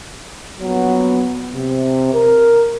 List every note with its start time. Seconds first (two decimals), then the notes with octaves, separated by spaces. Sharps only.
0.60 A#1 F#3 B3
1.54 C3
2.12 A#4